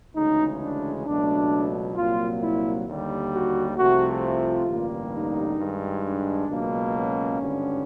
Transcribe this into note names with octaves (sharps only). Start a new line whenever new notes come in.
D2 C#3 E3 G#3 D#4
D4
C#2 B2 F#3 A3 D4
C2 A#2 F#3 A#3 F4
E4
D#2 D3 G3
F#4
C2 C3 F3 A3 F#4
F4
A1 G2 D3 G3 A#3
D#4
G2 D#3 G#3
D4
C#2 B2 F#3 A#3
C#4
G#1 G2 D3